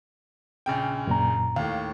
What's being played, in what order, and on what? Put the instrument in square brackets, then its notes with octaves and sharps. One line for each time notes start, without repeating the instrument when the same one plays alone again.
[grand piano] A#1 C#3 G5
[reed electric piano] F#2 A#2 A#5
[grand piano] D#2 A2 [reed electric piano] F5